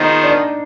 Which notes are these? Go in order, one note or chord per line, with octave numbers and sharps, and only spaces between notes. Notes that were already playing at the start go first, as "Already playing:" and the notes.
Already playing: D#3 B3 D#4 F4 G#4 C5
D4